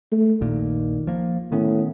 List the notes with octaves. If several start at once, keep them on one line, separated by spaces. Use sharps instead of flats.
A3
A#1 D#2 A#2 D#3
F3 A#3
A2 D#3 B3 C#4